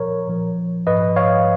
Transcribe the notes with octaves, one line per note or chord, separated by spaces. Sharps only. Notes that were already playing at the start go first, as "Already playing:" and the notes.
Already playing: A#2 F3 A#4 C#5
A#2 F3
G#2 F3 B4 D#5
C#5 F5